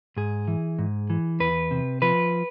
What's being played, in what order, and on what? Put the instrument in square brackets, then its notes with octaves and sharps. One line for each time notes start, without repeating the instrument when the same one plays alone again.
[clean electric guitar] G#2 G#4
E3
G#2
E3
E2 B4
C3
F3 B4